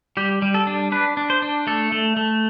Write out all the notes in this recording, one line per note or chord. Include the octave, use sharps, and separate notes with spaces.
G3 G4
G3
A4
D4
D4 B4
D4
C5
D4
A3 A4
A3
A3